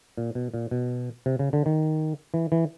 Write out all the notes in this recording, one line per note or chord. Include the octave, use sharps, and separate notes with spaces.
A#2
B2
A#2
B2
C3
C#3
D3
D#3
E3
E3